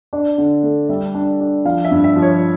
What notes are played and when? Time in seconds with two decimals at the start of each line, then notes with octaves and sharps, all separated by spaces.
0.13 D4 D5
0.38 D3
0.63 A3
0.89 G3 E5
1.14 D4
1.40 D4
1.65 F3 F5
1.84 E5
1.91 G2
2.04 E5
2.16 F3
2.22 C#5